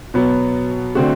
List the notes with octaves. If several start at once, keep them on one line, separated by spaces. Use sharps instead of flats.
B2 F#3 B3
D3 A3 C4 F#4